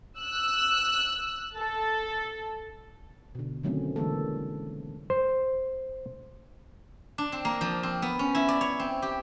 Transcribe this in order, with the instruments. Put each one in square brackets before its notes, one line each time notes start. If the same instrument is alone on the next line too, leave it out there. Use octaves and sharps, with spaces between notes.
[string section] E6 F#6
A4
[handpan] B2 D3
D3 D#3 F#3 A3 C4 C#4
D3 E3 G#3 A#3 A4
[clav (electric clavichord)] C5
[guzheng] D4
C4
A#3
F3
C4
B3
C#4
E4
D5
C#5
C4
G4